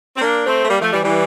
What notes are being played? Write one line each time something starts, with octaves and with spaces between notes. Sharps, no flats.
C4
A#3 D4
A3 C4
A3
G3 A#3
F3 A3
E3 G3
E3 G3